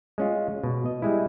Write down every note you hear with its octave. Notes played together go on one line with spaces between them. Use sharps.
G#3 C#4 F4
B2
D#5
G3 G#3 E4